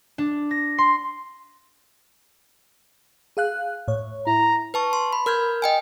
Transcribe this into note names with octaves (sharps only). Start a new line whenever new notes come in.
D4
A#6
C6
G#4 F5 F#6
A2 C#5
E4 A#5
B4 A5 C#6
C6
B5
A#4 F6 G6 G#6
D#5 G5 G#5